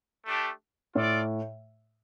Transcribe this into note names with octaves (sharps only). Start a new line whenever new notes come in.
A3 D4 G4
A2 F4 A4 D5